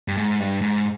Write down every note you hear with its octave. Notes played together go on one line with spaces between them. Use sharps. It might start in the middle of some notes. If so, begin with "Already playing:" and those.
G2
G#2
G2
G#2